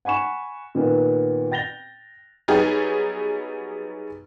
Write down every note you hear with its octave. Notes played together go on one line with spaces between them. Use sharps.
F#5 G#5 B5 C#6 E7
A#2 D#3 A#3 B3
G5 A6 A#6 F7 G7
F#3 G3 B3 D#4 G#4